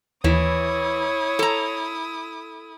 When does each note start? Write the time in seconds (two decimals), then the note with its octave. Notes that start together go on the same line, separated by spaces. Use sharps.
0.24 D#2 E3 E4 C#5 D#6
1.39 A4 A#5